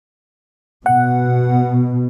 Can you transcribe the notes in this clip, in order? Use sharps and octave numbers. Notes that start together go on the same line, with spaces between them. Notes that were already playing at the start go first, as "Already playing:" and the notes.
B2 F#5